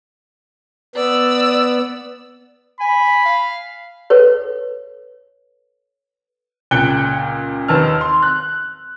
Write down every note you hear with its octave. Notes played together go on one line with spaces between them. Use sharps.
B3 D5 E6
G#5 B5
F5
A4 B4 C#5
C#2 A#2 G5 F#6 C#7 G7
D#2 D#3 B4 A5 E6 F6
C6
F#6